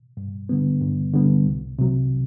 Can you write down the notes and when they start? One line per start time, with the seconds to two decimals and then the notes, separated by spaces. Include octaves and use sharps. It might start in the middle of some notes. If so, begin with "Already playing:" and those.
0.17 G2
0.49 D3 G3 B3
0.81 G2
1.14 D3 G3 B3
1.46 C2
1.79 C3 F#3